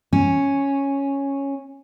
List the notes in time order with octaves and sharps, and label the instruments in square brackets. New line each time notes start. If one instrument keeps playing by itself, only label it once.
[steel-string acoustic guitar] C#4